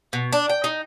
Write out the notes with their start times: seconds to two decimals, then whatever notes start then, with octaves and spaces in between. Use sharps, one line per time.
0.13 B2
0.32 D4
0.49 G5
0.64 D#4